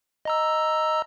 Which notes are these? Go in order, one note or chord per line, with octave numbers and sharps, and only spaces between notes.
D#5 A#5 E6